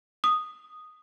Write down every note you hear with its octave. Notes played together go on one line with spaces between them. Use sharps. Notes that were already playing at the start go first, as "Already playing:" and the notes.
D#6